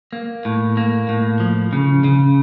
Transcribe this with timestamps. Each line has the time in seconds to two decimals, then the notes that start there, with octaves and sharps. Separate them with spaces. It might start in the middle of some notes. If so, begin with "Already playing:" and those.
0.13 A#3
0.45 A2
0.77 A#3
1.09 A2
1.40 F3
1.73 C#3
2.04 C#3